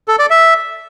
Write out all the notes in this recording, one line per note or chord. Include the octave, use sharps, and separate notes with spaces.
A4
D5
E5